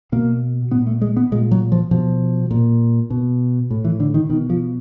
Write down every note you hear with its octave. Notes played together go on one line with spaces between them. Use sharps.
B2 A#3
A#2 B3
A3
G#3
B3
A#2 G#3
F#3
F3
B2 F3
A#2
B2
A2
E3
D3
D#3
B2 D#3
F3